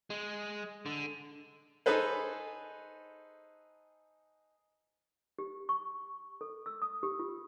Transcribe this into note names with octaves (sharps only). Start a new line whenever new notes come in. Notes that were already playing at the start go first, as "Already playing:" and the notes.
G#3
D3
D#4 G#4 A4 B4 C5
G4
C#6
A4
E6
D#6
G4
F4